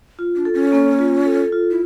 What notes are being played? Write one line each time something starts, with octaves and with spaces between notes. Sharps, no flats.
F4
D4
A4
C#4
A#3
F4
A4
F4
E4